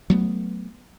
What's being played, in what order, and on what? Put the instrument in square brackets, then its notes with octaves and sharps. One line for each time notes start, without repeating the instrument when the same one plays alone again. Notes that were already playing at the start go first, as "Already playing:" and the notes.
[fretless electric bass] F#3 A3 B3